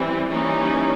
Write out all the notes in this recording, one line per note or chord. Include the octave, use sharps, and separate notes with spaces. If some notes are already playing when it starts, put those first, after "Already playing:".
Already playing: E3 G3 C4
E3 G3 A#3 C#4 D#4